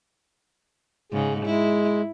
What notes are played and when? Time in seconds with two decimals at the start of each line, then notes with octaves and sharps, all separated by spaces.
1.12 G#2 C#3 G#4
1.46 G#3 E4